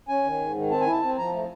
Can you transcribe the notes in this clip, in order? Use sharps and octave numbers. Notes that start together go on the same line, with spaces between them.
C#4 G#5
D#3
G#2
D#3
C4 A5
G#5
E4
A5
C4
F3 A#5
A3